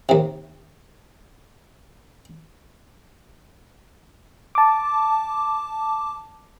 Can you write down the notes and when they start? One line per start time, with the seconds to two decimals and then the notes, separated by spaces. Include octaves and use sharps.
0.09 D#2 C3
4.55 A5 D6